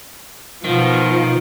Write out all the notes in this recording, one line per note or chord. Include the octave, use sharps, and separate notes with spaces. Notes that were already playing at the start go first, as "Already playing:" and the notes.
B2 D#3 F3 F4